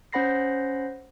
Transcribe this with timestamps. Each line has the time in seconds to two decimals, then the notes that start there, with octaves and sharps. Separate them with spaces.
0.13 C#4 C5 F#5 B5 A#6 C7